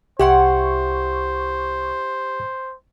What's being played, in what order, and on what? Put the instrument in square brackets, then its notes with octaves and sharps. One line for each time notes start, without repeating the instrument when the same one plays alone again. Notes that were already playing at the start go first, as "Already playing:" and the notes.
[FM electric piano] C2 C#6 [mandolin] E4 F#5 C6 [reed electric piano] G4 [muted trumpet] C5